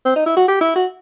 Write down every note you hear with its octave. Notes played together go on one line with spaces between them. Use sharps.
C4
D#4
E4
F#4
G4
E4
F#4